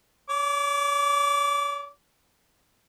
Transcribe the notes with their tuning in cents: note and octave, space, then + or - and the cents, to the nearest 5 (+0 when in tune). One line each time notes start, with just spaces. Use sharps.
C#5 +35 D6 -20